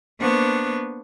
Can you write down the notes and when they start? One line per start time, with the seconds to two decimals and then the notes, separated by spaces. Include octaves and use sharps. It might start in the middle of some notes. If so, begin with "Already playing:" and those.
0.20 A#3 B3 D4 C5 C#6